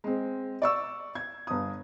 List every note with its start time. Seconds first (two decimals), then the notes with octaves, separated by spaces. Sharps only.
0.04 G#3 C4
0.62 D5 C#6 E6
1.15 G#6
1.47 G1 D#6